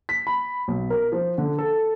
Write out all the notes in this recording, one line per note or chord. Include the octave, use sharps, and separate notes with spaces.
B6
B5
B1
A#4
F3
D3
A4